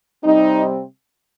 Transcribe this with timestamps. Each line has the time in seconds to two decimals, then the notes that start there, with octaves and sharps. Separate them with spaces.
0.24 C3 G3 C4 D#4